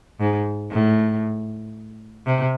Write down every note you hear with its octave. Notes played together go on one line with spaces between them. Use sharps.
G#2
A2
C3